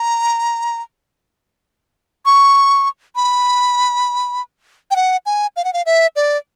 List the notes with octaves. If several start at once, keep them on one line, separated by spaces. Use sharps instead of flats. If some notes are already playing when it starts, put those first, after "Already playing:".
Already playing: A#5
C#6
B5
G5
F#5
G#5
F5
F#5
F5
E5
D5